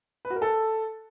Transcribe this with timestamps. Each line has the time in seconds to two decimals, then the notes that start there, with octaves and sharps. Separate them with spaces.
0.25 B4
0.30 F#4
0.36 A#4
0.42 A4